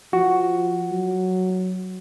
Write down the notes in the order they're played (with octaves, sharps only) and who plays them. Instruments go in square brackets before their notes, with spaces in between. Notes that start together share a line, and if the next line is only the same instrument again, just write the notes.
[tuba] F3 [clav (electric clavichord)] F#4
[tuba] F#3